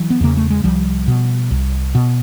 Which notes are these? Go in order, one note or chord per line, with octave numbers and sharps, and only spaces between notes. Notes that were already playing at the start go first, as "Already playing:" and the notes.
Already playing: E3 F#3
B3
E2 C#3 A#3
A3
G#3
C2 F3 G3
B2
C2
B2